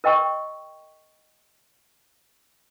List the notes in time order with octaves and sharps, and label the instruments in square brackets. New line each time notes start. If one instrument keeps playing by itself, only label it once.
[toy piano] A#4 D#5 G5 C#6